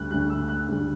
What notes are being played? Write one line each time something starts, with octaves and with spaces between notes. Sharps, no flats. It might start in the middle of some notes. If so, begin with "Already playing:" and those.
Already playing: D2 D3 G3 F#6
D2 D3 G3 F#6
E6
F#6
D2 D3 G3